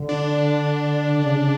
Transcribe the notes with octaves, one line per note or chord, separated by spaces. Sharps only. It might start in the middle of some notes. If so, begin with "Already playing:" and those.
Already playing: D3
D4
D3
C#3
C#3